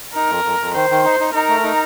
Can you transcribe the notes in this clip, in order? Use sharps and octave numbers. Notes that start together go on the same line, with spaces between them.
D#4 A#4
F2
F2
F2
D#3 C5
D#3
D#4
D#4
D#4 A#4
A3
D#4